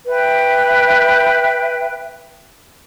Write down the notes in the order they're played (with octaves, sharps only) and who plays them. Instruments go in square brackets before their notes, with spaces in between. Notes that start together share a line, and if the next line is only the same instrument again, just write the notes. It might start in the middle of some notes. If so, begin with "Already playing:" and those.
[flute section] B4 E5 G5